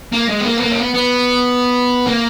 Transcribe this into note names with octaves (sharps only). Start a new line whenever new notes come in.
A#3
G#3
B3
A#3
B3
A#3
C#4
B3
B3
A#3